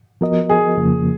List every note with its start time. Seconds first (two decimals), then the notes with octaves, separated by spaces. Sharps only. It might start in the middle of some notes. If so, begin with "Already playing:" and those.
0.21 F3 B3 F#4 A#4 D#5
0.50 G#4
0.77 F2 C#3 F3 A#3